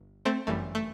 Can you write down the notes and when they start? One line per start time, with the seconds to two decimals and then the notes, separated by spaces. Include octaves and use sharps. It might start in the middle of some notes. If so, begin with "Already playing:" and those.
Already playing: G1
0.25 A3 C4
0.47 G1 F#2 E3 G3 A3
0.75 A3